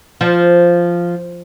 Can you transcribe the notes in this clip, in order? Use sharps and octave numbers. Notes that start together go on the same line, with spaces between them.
F3